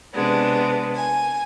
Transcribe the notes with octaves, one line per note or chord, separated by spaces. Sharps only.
C3 G#3 B3 D4
G#5